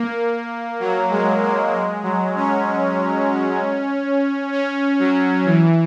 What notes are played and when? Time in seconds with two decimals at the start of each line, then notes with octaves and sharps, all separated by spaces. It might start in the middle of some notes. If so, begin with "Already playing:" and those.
Already playing: A#3
0.80 F#3
1.10 G#3
1.42 A#3
1.72 G#3
2.03 F#3
2.36 C#4
4.52 C#4
4.99 F#3
5.45 E3